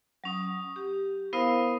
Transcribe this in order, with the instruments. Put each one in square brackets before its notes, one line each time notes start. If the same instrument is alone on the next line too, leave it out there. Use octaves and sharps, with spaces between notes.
[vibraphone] F#3 C#4 D#6
G4
B3 E4 A#4 C5 F5 D#6